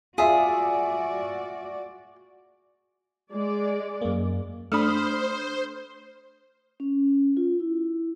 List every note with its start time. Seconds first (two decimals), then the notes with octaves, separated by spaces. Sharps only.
0.18 F4 F#4 G#4 D5 E5
3.32 G#3 D5
4.02 F#2 A#3
4.72 A3 D4 C5 B5 D#6 F6
6.80 C#4
7.37 F4
7.60 E4